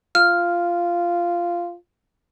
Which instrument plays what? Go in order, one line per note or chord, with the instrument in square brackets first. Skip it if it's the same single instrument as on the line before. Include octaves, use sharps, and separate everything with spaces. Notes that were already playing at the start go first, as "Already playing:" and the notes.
[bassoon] F4 [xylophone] F6